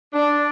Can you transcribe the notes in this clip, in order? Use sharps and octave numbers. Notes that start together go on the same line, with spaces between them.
D4